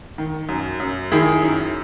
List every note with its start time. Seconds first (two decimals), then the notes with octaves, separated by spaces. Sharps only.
0.18 D#3
0.49 F#2
0.80 F#2
1.12 D#3 E4 G#4
1.42 F#2